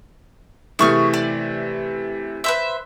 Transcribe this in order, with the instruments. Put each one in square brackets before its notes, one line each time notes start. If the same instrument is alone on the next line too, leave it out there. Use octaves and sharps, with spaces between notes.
[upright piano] C3 E3 A3 [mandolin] G#4 C#6 F6
[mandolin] D5
B4 C5 E5